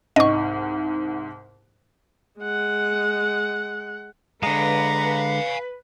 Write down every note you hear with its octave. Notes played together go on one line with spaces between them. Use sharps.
C2 G#2 D#5 F#5 C#6
G#3 F#5
D3 G#3 B4 F5 G#5 A#5